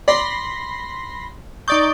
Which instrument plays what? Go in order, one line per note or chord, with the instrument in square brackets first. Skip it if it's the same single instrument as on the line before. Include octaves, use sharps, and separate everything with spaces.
[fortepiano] D5 [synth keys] B5 C6 A#6
[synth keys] D#4 D5 G6 [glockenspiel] C#6 D#6 A6